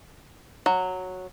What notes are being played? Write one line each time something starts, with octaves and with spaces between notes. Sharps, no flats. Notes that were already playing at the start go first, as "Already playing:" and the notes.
F#3